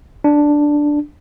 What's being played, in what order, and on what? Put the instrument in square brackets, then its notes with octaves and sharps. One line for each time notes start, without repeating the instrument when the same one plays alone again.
[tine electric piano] D4